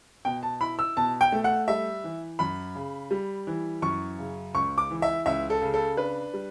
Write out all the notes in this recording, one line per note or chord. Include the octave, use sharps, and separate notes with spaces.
B2 G5
A5
E4 B5
E6
B2 A5
G5
A3
F#5
G3 E5
E3
F#2 B5
C#3
G3
E3
F#2 C#6
C#3
C#2 C#6
D6
E3
E5
C#2 E5
A4
C#3
A4
D4 B4
G3